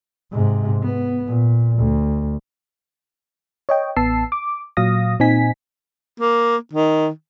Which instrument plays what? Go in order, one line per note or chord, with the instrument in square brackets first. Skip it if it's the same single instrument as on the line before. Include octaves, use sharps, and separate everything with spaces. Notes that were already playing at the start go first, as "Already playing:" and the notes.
[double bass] G#2 C3
B3
A#2
D2
[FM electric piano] C#5 D#5 G5
A1 B3 A5 E6 C7
D6
A#2 F#3 F5 D#6 A#6
A#2 C4 D#4 G#5 B6
[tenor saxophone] A#3
D#3